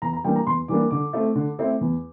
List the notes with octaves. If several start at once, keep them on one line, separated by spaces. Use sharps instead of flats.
E2 A#5
A#5
E3 G3 A#3 D4 G5
A#5
E2 C6
E3 G3 A#3 D4 D6
D3 D6
A3 C4 E4
D3
A3 C4 E4
E2